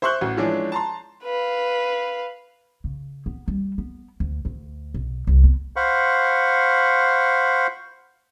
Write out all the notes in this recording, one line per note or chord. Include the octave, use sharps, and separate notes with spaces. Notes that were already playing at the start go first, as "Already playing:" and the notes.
C5 E5 C6 C#6 F#6 G6
A1 F#4
E3 F3 G#3 C#4 D4
A5 A#5 C6
B4 F5
C#3
B3
G3
B3
D2
D2
B1
C2
B3
C5 F5 F#5 B5 C#6